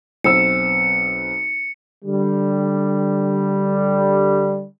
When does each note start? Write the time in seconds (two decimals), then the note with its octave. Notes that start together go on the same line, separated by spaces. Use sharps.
0.24 B1 C4 E6 C#7
2.05 D3 G3